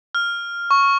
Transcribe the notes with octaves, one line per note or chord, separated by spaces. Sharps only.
F6
C#6